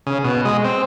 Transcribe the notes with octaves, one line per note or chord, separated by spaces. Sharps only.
C#3
B2
G#3
C4